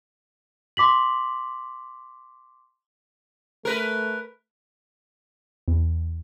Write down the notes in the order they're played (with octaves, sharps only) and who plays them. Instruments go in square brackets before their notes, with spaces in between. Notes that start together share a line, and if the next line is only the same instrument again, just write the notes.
[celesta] C6 D6 B6 F#7
[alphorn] A3 [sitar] A#4 B4
[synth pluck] E2